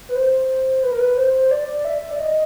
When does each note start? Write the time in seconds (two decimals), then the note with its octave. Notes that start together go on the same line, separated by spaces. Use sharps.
0.09 B4
0.16 C5
0.83 B4
0.91 A#4
1.00 B4
1.17 C5
1.51 D5
1.85 E5
2.11 D5
2.19 D#5